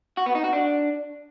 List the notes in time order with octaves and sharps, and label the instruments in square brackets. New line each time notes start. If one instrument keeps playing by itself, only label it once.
[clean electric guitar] F#4
B3
D#4
F#4
D4